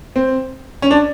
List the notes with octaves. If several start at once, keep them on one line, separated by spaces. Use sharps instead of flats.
C4
C#4
D4